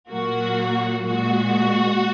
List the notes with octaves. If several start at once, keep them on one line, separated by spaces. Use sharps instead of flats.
A#2 F#3 A#3 F#4
A#2 G#3 F#4